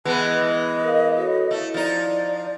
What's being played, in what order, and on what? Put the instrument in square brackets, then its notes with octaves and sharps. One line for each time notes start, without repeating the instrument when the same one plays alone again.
[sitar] E3 G#3 B3 [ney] A5
[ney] D#5
[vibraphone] A#4 F5
F#4 A4 C#5
[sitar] A3 [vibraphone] E4
[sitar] F3 D#4 [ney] D5